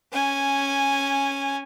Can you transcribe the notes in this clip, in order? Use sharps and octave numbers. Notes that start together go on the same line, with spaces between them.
C#4 G#5